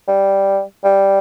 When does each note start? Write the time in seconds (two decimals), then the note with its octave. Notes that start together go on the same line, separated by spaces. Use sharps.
0.08 G3
0.84 G3